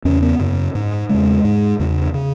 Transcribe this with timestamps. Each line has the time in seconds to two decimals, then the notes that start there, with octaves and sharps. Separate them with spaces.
0.05 E2 C#3 C#4
0.22 B3
0.39 F#2 C#3
0.75 G#2
1.09 E2 C#3 G#3
1.45 G#2
1.80 E2 C#3
2.14 C#3